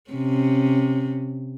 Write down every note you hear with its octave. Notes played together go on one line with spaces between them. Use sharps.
C3 C#4